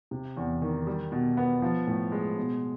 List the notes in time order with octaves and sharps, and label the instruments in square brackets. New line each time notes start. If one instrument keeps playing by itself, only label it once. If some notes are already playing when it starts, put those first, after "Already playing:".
[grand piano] C3
E2
D#3
G3
B2
B3
F3
A2
G#3
B2